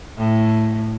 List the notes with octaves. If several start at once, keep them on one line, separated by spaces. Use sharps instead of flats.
A2